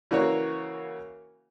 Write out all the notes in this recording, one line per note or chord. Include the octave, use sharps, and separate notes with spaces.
C#3 E3 A#3 F#4 A#4 C#5